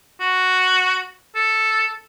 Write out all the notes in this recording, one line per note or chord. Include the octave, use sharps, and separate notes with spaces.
F#4
A4